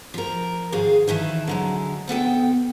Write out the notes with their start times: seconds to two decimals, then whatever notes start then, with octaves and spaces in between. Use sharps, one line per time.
0.14 F3 A#4
0.72 G#2 D#3 G#4 F5
1.08 D#3 E3 E4 A5
1.47 D3 F#3 G#3
2.08 D2 B3 A4 G5